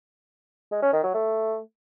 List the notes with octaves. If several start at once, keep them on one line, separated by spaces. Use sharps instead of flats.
G#3
C#4
D#3
F#3
A3